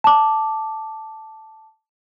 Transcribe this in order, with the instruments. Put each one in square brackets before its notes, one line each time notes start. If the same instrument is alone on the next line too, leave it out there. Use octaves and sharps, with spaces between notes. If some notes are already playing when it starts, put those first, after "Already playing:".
[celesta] A5 D6